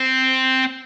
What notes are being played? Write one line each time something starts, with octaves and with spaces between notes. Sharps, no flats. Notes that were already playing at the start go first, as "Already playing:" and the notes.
Already playing: C4